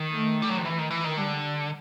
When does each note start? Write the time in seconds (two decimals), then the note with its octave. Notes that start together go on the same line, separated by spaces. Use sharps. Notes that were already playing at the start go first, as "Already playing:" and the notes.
Already playing: D#3
0.12 A3
0.42 G3
0.49 F#3
0.57 F3
0.65 E3
0.79 D#3
0.91 E3
1.04 D#3
1.17 D3 G3